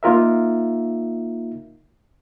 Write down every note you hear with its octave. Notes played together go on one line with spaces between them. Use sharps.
A#3 D#4 F4 A#4 E5